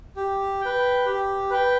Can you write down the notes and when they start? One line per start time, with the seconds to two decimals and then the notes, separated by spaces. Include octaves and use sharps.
0.16 G4
0.61 B4 G5
1.06 G4
1.50 B4 G5